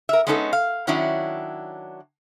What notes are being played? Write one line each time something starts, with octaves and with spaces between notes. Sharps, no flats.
A#4 E5
G#3 B3 C#4 D#4 G4 A4
F5
D#3 F#3 C#4 D4 E4